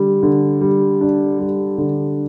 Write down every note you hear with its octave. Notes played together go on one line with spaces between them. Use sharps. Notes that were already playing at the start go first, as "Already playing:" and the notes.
Already playing: D3 G3
D3
G3
D4
G3
D3